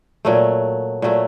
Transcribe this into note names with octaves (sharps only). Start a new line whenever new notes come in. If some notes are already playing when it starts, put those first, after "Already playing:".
A#2 F#3 A3
A#2 F#3 A3